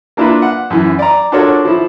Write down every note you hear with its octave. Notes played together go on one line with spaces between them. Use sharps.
A#3 D4 E4 F4 A#4 B4
F#5
F#2 E3
D5 A#5
D4 F4 F#4 A4 A#4 C#5
F3 E4